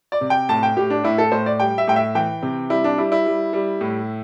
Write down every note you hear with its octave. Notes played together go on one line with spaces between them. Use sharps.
D5
C3
G5
A2 A5
G5
A2 G4
D4
A2 E4
A4
A2 C5
D5
G3 G5
E5
A2 G5
E5
E3 G5
C3
G3 E4
D4
G3 E4
E4
G3
G3
A2